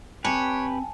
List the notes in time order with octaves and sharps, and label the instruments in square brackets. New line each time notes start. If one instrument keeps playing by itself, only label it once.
[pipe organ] C4 [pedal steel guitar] G4 B4 [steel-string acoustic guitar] C#5 [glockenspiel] G#5 A5